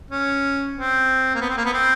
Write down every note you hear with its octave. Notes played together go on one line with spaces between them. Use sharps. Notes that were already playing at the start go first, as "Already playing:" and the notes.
C#4
C4
A#3
B3
C4
A#3
B3
C4